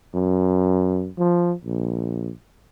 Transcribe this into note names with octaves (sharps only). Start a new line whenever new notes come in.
F#2
F3
A#1